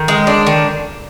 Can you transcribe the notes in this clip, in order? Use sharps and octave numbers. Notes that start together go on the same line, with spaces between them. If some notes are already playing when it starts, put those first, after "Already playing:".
Already playing: D#3
G#3
D4
D#3